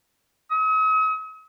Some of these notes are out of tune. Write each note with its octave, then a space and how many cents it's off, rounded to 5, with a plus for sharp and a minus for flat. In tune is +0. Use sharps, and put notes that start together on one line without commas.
D#6 +45